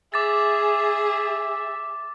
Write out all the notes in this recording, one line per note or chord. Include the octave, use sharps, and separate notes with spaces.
G#4 E5 D6 A6